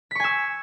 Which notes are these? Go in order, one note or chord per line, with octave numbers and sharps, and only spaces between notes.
G#5 C#6 E6 B6